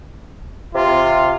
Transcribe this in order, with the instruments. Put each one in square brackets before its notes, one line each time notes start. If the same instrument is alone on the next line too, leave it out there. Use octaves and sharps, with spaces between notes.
[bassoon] C3 [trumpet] F4